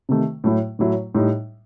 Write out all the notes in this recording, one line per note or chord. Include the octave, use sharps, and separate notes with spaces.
C3 D#3 A3
A2 F#3 A3 E4
A2 F#3 A3 E4
A2 G3 D#4